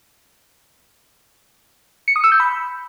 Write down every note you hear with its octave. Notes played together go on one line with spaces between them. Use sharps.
C#7
D#6
E6
G6
B5